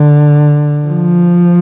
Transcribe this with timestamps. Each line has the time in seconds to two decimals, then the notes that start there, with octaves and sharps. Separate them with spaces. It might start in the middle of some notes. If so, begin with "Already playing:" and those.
Already playing: D3
0.86 F3